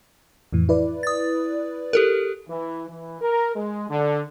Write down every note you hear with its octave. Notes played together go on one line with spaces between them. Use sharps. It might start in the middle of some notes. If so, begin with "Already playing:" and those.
F2 A2 E3
E4 B4 D5
D#6 A6
G4 A4 A#4
E3
E3
A#4
G#3
D3